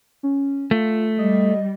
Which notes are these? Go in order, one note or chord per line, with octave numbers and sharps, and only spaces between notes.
C#4
A3 F4
G3 D#5